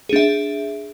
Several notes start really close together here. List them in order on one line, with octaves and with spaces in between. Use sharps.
G#4 D4 E5